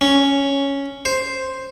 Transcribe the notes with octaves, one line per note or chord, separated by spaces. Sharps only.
C#4
C5